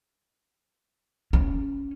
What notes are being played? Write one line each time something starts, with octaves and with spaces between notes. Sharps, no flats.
C#4